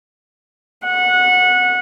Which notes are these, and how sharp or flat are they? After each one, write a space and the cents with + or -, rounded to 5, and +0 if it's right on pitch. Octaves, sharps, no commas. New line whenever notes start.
F#5 -20